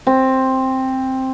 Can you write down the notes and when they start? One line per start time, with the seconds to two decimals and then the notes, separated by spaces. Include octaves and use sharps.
0.07 C4